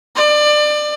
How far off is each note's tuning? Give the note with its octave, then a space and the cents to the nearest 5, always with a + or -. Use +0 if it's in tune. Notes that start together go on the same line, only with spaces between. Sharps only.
D5 +25